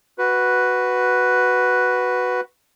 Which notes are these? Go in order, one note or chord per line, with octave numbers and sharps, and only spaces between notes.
F#4 B4